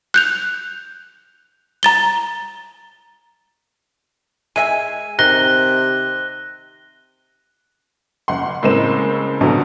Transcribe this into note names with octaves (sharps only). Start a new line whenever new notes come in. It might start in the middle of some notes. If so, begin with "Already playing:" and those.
F#6 G6 F7
A#5 A6 G7
G#3 E5 G#5 D#7
C3 D#3 F#6 A#6 G7
F#1 F#5 C6
A2 C#3 G#3 A#3 C4 E7
A#1 B2 D3 F#3